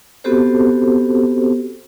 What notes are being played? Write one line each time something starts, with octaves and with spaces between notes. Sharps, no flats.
B3 C4 F#4 G4 A4 C5